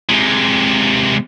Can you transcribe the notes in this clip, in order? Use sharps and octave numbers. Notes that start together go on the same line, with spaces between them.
C3 G#3